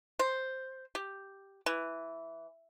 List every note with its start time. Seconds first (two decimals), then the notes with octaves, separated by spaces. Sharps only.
0.19 C5
0.95 G4
1.66 E3